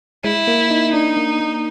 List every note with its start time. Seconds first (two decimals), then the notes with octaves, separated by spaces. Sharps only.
0.24 G#3 E4
0.47 A#3
0.71 D#4
0.94 D4 D#4
1.17 A#3
1.40 A#3